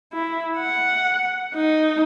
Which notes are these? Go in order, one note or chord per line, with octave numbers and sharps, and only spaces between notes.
E4
F#5
D#4